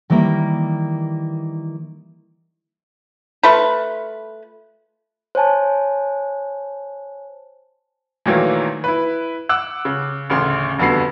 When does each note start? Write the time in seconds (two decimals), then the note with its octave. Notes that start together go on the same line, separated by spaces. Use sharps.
0.10 D#3 E3 G3 A#3
3.43 A3 F4 B4
5.35 C5 C#5 G#5 A5
8.26 A#2 D#3 E3 F#3 A3 A#3
8.84 E4 B4
9.49 F#5 D6 E6 F#6
9.85 C#3
10.30 A1 D2 C#3 C6
10.79 F1 G2 D3 B3 F#4 C7